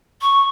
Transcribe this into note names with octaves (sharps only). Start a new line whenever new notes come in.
C#6